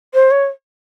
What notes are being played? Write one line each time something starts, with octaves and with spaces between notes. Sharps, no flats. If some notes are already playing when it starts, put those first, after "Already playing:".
C5
C#5